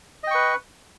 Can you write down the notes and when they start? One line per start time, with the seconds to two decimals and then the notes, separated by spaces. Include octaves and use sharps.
0.23 D#5
0.27 G5
0.31 C#6
0.35 B4